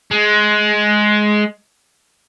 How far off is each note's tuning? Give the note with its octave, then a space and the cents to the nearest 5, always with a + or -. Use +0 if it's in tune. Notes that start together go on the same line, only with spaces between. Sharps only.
G#3 +15